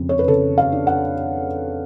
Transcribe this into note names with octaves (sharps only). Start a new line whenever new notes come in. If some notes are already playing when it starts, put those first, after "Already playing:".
Already playing: F2 C#3
C#5
B4
C#3 A4
F5
D4
F#5